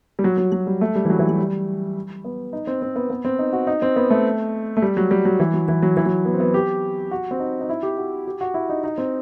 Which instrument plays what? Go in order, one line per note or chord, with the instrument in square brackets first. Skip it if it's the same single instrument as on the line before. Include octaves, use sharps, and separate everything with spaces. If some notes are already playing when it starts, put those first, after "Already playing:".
[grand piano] G3
F#3
F#3
F#3
G3
A3
G3
E3
F#3
E3
F#3
G3
B3
D#4
C4
C4
B3
B3
C4
D#4
F#4
D#4
C4
B3
A3
A3
G3
F#3
G3
F#3
E3
F#3
E3
F#3
E3
F#3
B3
C4
B3
G4
F#4
C4
D#4
D#4
E4
G4
F#4
G4
F#4
E4
D#4
D#4
C4